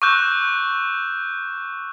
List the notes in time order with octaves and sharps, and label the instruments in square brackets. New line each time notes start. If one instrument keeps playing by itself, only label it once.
[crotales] C#6 D6 E6 F#6 G6